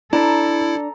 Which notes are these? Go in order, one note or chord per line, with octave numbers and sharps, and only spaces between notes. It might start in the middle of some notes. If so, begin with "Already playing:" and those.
D4 E4 A4 A#5